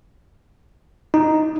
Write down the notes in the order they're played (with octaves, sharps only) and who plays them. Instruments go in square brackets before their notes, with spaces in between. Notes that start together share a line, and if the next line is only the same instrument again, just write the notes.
[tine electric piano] D#4